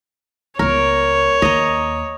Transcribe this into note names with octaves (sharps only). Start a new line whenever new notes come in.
C#2 B3 A#4 C#5
D#2 D#5 A#5